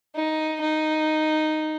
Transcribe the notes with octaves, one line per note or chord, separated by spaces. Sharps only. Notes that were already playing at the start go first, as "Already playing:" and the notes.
D#4
D#4